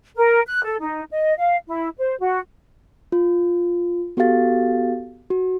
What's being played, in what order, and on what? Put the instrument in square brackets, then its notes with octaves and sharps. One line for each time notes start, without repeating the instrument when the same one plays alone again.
[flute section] A#4
F#6
A4
D#4
D#5
F5
E4
C5
F#4
[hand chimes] F4
B3 F#4 G4 A4 F5 A6
F#4